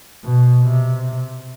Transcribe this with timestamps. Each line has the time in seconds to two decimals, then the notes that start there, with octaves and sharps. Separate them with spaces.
0.24 B2
0.63 C3